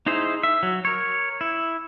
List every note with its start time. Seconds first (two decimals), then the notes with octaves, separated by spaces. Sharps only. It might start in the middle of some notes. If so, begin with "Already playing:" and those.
0.06 D#4 E4 G#4 C5
0.43 E5
0.63 F#3
0.85 A#4 C#5
1.41 E4